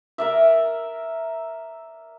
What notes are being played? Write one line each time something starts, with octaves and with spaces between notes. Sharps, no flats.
A#4 D5 E5